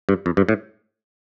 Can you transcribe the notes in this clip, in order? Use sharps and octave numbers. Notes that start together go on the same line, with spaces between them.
G2
F2
G2
A2